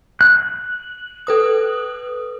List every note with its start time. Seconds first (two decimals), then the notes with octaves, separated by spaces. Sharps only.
0.21 F#6
1.27 A4 B4 D#6